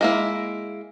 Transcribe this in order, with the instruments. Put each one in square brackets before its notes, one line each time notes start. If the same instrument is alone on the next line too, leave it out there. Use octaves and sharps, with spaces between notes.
[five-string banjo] G#3 A#3 E4